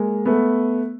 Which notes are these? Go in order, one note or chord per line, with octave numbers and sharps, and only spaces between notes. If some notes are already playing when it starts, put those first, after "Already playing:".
Already playing: G#3 A#3
A3 B3